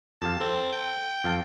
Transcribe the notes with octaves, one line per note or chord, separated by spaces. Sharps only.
F2 G4 F5 A5
C4 A4
G5
F2 F5 A5